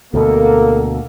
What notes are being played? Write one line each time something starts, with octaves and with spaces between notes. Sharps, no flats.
D2 B2 A#3 A4